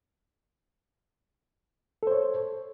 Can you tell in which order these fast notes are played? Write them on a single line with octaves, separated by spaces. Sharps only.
A4 C5 C#5